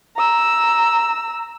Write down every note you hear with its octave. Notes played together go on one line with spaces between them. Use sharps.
A#5 E6